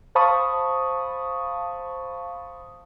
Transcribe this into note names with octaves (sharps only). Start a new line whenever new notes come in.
C5 F5 A5 B5 C#6 D#6